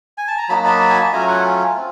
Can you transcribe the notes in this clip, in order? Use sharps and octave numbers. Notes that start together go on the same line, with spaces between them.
G#5
A5
A#5
F#3 A#3 D#4 F#4 A5 B5
A5 B5
G#5
A5
F#3 A3 C#4 F4 G#5 A#5
F#5 G#5
C4 F4